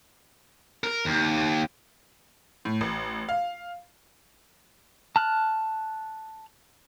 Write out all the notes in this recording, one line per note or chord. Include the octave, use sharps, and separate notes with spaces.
A#4
D#2
A2
A1
F5
A5 F6 F#6